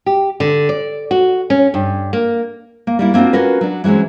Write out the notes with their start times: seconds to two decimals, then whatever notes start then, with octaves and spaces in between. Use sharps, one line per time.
0.06 G4
0.40 D3
0.69 D5
1.11 F#4
1.50 C#4
1.74 G2
2.13 A#3
2.87 A#3
2.99 G3 A#3 E4
3.14 A#3 C4 D4 F4 F#4
3.33 C#4 F4 F#4 A#4 B4
3.61 F#3 D4
3.84 E3 F#3 G#3 C4 C#4